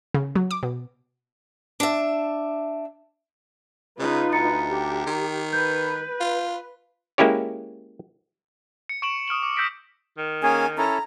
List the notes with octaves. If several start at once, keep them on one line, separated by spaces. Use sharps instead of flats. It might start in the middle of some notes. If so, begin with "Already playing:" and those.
C#3
F#3
D6
B2
D4 E5
C#3 D#4 F4 B4
D2 A#5 A6 C#7
G4
D#3
B4 G6
F4
G#3 A#3 C#4 E4 G4 C#5
C#7
C#6 D7 E7 F#7
D#6 F6 D7 F#7
D6
E6 G6 A#6 B6 D7
D#3
A#3 C#4 G#4 G#5
C#4 E4 A4 A#5